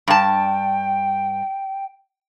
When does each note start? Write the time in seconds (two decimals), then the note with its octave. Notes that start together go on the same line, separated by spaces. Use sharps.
0.08 G2 G5 A5